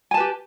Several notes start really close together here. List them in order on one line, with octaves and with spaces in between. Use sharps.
G#5 A5 B4 G4